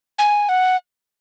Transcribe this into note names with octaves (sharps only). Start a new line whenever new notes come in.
G#5
F#5